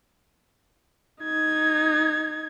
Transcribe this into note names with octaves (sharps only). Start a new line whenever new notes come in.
D#4 G#6